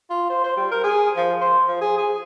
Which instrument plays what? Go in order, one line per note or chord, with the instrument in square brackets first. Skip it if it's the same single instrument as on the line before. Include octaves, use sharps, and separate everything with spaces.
[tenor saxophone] F4
C5
C5
G3
A#4
G#4
F3
C5
F3
G#4
G#4